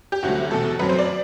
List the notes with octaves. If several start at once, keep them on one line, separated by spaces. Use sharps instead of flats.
G4
D2 C3 F#3 A3 F#4
E2 B2 A3 A4
F#2 F#3 C4 B4
C5
D5